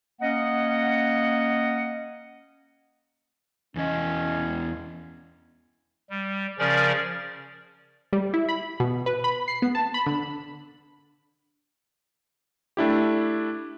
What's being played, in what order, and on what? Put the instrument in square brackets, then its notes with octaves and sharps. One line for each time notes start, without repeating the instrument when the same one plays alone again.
[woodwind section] A#3 C#4 D#5 F#5
[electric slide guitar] E2 E3 D#5 [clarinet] C#4
[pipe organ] G3
C#3 F3 C#4 A#4 D5 A6
[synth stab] G3
E4
B5
B2
B4
B5
C7
B3
A5
B5
D3
[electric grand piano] A3 D4 E4 G4